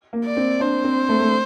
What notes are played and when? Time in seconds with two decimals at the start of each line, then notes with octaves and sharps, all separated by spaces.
0.13 A#3
0.25 D5
0.37 C4
0.60 D4 C5
0.84 C4
1.09 A3
1.21 A3